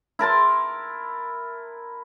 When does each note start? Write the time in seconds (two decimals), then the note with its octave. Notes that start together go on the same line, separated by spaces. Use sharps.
0.19 E4 A#4 A5 C6